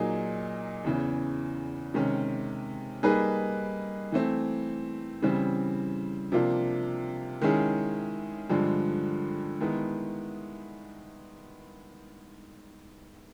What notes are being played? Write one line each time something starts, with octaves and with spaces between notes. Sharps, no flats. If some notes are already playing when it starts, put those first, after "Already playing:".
Already playing: A#2 F#3 A#3 D#4 G#4
E2 C#3 E3
C3 D#3 G#3 C#4
G3 A#3 D#4 G#4 B4
E3 A3 C4
C#3 E3 G3 C4
C3 F3 A#3 D4 F4
D#3 G#3 C#4 E4 G#4
G2 D3 F3 G#3
D#3 G#3 B3 E4